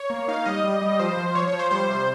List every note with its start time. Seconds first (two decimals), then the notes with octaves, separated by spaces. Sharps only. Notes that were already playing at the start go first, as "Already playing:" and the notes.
Already playing: C#5
0.10 A#3
0.28 D#4 F5
0.45 G3 D#5
0.64 G3
0.82 G3
0.99 F3 C5
1.17 F3
1.35 F3 C#5
1.48 C#5
1.53 F3
1.59 C5
1.71 G3 C5
1.89 C3